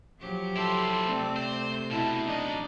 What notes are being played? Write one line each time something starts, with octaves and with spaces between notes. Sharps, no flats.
F3 F#3 G4
E4 A4 C5 C6
C3 A3 C4 D5
C5 G6
B2 E4 A5
F#3 D4 D#4 D5 D#5